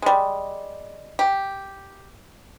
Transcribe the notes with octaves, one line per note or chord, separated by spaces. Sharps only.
G3 G#3
G4